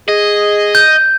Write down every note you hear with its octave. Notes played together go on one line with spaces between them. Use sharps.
G#4 D#5
G6